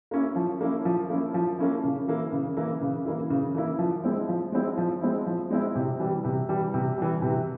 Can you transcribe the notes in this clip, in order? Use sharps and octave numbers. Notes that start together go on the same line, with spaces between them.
A#3 C#4 E4
F3
A#3 C#4 E4
F3
A#3 C#4 E4
F3
A#3 C#4 E4
C#3
E3 A#3 E4
C#3
E3 A#3 E4
C#3
E3 A#3 E4
C#3
E3 A#3 E4
F3
G#3 C4 E4
F3
G#3 C4 E4
F3
G#3 C4 E4
F3
G#3 C4 E4
C3
E3 G3
C3
E3 G3
C3
E3 G3
C3